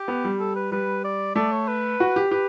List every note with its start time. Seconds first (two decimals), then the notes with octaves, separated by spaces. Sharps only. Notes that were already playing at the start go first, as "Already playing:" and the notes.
Already playing: G4
0.08 B3
0.24 G3
0.39 A4
0.56 B4
0.72 G3 B4
1.04 D5
1.35 A3 D5
1.51 C#5
1.68 B4
2.00 F#4
2.16 G4
2.31 G4 B4